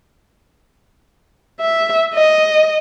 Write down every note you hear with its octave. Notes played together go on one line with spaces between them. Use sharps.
E5
D#5